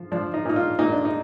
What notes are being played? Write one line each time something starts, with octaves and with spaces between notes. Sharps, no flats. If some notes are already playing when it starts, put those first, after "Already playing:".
Already playing: F3
F3 D4
D#4
A#2 D#4
F4
A#2 D#4
D4
D#4